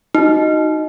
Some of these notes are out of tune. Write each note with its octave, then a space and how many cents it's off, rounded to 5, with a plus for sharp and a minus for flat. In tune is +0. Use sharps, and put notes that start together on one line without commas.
D#4 +0 F#4 -5